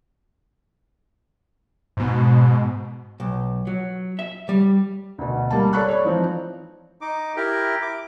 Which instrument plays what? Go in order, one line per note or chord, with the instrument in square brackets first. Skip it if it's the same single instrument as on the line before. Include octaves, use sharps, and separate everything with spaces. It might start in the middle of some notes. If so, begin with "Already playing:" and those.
[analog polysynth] G#2 B2
[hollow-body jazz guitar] B1
F#3
E5
G3
[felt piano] D2 B2
G3 A#3 A5
A4 C#5 D5 B5 C#6 F#6
C#5 D5
E3 F3 C4 D#4
[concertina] D#4 D6
E4 G4 A#4 G5
D6